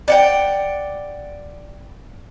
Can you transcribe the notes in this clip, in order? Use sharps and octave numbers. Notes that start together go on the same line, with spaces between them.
D5 F#5 G5